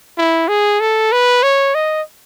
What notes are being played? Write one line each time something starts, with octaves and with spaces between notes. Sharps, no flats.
E4
G#4
A4
B4
C#5
D#5